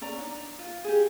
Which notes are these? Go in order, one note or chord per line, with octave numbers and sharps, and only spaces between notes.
C#4 D5 A#5
D4 D#4
F4
G4 G#4